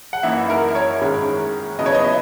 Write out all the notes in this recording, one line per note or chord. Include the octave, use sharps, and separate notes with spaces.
F#5
F#2 E3 A#3 D#4 E5
A#4
C#5
G#2 D#3 G#3 C#4 E4
C#3 F#3 B3 E4 D#5
C#5
D#5
E5